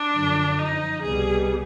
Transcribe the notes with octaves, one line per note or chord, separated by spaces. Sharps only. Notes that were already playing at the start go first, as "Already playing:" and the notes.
Already playing: D4
F#2 D3 F3
D#4
C2 B2 G3 B3 G#4